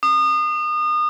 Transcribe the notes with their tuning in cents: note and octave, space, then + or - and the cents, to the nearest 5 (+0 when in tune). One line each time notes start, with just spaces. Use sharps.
D#6 -30